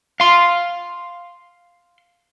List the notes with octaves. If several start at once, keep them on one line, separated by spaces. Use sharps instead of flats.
F5 C6